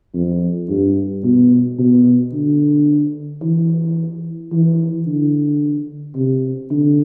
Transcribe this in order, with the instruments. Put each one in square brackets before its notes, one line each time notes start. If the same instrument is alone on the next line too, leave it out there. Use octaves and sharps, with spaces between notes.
[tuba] F2
G2
B2
B2
D3
E3
E3
D3
C3
D3